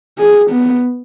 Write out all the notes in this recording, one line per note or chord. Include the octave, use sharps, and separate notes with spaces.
G#4
B3